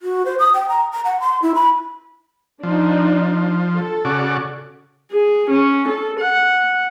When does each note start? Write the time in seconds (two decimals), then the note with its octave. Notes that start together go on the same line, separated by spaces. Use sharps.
0.02 F#4
0.25 C5
0.39 D#6
0.54 G5
0.69 A#5
0.92 A#5
1.05 F#5
1.20 C6
1.42 E4
1.55 B5
2.63 F3 D4 D#4
3.75 A4
4.05 C#3 F#4 D5
5.11 G#4
5.50 C#4
5.88 A4
6.20 F#5